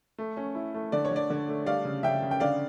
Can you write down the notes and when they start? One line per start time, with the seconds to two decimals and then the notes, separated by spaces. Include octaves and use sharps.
0.18 A3
0.37 C#4
0.55 E4
0.74 A3
0.92 D3 D5
1.05 C#5
1.11 D3
1.16 D5
1.30 D3
1.48 A3
1.66 G3 D5 F5
1.85 C#3
2.03 C#3 E5 G5
2.22 C#3
2.31 G5
2.40 D3 D5 F5